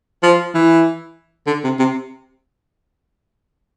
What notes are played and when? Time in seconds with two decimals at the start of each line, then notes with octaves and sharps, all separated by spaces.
0.23 F3
0.55 E3
1.47 D3
1.64 C3
1.79 C3